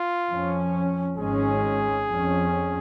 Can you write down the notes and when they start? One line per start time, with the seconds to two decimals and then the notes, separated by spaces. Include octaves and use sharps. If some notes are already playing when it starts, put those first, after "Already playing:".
Already playing: F4
0.29 F2 F3 C#4
1.17 G#1 G#2 G#3 C#4 G#4
2.06 F2 F3 C#4